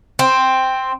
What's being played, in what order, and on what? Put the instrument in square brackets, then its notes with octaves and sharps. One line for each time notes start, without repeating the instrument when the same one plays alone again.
[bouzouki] C4